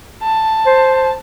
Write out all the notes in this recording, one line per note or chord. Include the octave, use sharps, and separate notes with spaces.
A5
C5